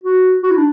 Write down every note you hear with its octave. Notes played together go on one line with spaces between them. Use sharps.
F#4
F#4
E4
D4